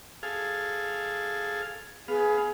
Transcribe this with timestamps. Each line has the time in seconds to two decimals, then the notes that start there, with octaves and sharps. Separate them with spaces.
0.23 G#4 A4 F5
2.08 B3 G#4 F5